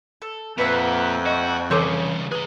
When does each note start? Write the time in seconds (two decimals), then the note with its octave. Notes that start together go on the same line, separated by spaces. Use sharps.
0.22 A4
0.58 F2 A#2 B4 E5 F#5
1.26 F#4 D#5
1.71 C2 C#3 E3 A4 C#5 D6 D#6
2.32 G#4 B4 A#5